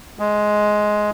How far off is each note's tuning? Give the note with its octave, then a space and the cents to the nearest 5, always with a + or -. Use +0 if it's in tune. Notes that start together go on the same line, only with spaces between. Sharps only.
G#3 +10